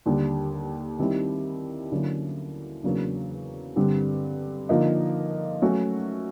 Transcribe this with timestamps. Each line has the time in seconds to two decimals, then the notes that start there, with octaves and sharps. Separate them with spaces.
0.06 D#2 D3 G3
0.99 D#3 G3 C4 E4
1.92 D3 F#3 A#3 C#4 E4
2.84 E2 C#3 F#3 A#3 D4
3.76 G2 D3 G3 C4
4.69 D3 F3 A#3 D#4
5.62 F#3 A3 C#4 F#4